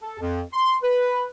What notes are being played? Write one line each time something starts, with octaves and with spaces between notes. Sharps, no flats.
A4
F2
C6
B4